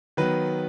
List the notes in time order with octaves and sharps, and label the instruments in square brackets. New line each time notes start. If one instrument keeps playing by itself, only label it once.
[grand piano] D#3 F#3 B3 B4